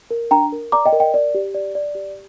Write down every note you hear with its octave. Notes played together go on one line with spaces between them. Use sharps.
A#4
D4 G5 A#5
A#4
D5 A#5 D6
D#5 G5
A#4
D#5 G5
D5
G4
D5
D5
G4